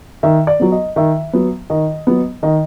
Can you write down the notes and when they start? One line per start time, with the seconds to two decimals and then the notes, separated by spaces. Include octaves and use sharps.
0.23 D#3 E5
0.47 D5
0.60 F#3 B3
0.72 D#5
0.96 D#3 E5
1.33 F#3 B3
1.70 D#3 D#5
2.07 F#3 B3
2.43 D#3 D#5